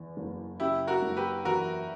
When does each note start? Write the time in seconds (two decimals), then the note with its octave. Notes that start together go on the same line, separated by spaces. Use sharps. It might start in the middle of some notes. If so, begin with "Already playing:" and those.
Already playing: E2
0.17 F#1
0.59 C#3 E4 G4
0.87 F#4 A#4
1.02 F#1
1.17 G4 B4
1.45 E2 F#4 A#4